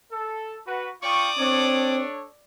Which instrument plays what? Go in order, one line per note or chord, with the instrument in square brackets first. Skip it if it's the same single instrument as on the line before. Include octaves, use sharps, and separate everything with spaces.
[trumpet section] A4
F#4 B4
[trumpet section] F4 G5 C#6 [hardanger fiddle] D5 D#6
[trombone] C4 [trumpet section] D4 A4 C#5